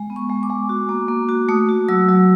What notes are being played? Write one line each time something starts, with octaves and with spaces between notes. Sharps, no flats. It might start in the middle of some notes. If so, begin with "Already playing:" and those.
Already playing: G#3
B3
C#6
G#3
D6
G#3
F#4
A#3
A#3
F#4
A3 D#6
F#4
F#3 E6
F#3